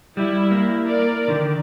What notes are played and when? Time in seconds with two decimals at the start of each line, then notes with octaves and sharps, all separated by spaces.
0.17 G3 E4
0.51 A#3
0.88 A#4 D5
1.28 D3 D#3